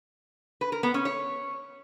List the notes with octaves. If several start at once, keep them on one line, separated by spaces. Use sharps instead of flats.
B4
A#4
B3
C#4
C#5